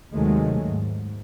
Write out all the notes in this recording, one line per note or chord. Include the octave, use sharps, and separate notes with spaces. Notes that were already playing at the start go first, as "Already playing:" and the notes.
D#2 C3 D#3 F#3 G#3 A3
G#2